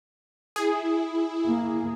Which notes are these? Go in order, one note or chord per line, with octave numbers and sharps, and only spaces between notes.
E4 G#4
A#3